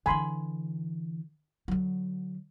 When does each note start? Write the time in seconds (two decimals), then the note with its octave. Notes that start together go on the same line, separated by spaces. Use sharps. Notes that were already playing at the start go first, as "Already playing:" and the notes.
0.06 D3 E3 G#5 B5 C6
1.68 D3 F#3